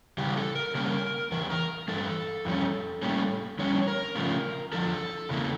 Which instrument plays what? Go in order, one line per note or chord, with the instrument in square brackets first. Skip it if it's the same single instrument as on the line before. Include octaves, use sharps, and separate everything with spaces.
[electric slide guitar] C#3 E3 G3 G4
A4
A#4
C#3 G3 A#3 C#4 A#4
E2 E3 A#4
A#4
G2 E3 A4
F2 D3 G3 C#4
A2 G3 A#3 C#4
F2 D3 G3 C#4 C#5
A#4
C#3 F3 A3
E2 D3 F3 A4
E2 C#3 E3 A#3